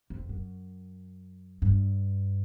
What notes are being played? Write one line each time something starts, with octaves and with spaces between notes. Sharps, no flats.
F2
F#2
G2